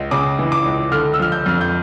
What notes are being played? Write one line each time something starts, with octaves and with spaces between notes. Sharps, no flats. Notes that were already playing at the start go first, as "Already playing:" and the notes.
Already playing: C#2
C#3 D6
E3
D6
C#2
D3 F6
E6
F3 F6
G6
F2 F6
G6